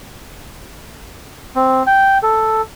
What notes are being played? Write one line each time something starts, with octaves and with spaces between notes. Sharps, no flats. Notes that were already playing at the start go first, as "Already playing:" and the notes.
C4
G5
A4